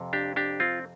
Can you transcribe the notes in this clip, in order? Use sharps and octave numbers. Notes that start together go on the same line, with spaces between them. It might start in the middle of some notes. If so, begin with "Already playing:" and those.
Already playing: F2 C3
D4 G4
D4 G4
C4 F4